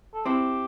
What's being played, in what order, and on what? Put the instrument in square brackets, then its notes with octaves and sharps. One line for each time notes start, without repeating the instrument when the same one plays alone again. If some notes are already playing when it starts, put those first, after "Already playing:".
[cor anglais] A4
[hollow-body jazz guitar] C4 E4 [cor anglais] G4